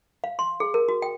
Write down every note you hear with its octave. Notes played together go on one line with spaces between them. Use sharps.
F5
C6
G#4
A#4
F#4
G5